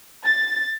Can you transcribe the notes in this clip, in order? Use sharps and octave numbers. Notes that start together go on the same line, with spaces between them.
A6